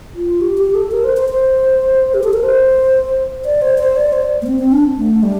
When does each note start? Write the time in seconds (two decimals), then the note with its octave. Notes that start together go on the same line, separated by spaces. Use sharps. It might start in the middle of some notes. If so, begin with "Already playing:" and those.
0.15 F4
0.41 G4
0.58 G4
0.75 A4
0.92 A#4
1.04 C5
1.17 C5
1.29 C5
2.14 G4
2.24 A4
2.34 A#4
2.44 C5
3.45 D5
3.62 C5
3.79 C5
3.96 D5
4.13 C5
4.42 A#3
4.47 C4
4.59 C4
4.72 D4
4.97 A3
5.23 G3